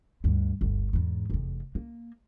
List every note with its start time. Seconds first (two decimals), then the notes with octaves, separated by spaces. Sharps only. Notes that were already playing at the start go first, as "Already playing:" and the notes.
0.24 D2 G2
0.61 G1 D2
0.93 E2 G#2
1.30 F1 E2
1.75 A#3